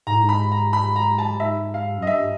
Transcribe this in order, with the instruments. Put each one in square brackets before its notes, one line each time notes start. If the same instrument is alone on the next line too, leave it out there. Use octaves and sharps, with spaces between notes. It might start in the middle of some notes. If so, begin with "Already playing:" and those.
[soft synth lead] G#2 [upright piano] A#5
[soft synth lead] A2
G#2
[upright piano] B5
A#5
B5
A#5
A5
[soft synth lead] G#2 [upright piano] E5
[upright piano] F5
[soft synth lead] F#2
[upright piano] D#5
[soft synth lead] G2 [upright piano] E5